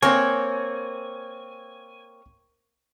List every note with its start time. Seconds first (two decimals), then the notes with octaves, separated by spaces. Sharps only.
0.03 A#3 C4 C#5 G#5 C#6